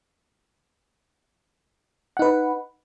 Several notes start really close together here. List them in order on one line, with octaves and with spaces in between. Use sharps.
F#5 D#4 B4